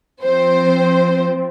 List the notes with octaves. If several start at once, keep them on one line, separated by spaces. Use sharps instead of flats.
F3 C4 C5